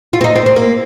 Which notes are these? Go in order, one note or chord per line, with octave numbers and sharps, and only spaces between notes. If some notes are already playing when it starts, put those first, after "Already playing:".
F4
C4
D#4
C4
C4
A#3